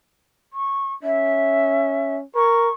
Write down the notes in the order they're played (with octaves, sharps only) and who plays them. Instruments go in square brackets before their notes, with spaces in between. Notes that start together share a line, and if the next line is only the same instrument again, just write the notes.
[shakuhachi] C#6
[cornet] C#4 [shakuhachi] E5
[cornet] A#4 [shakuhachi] C#6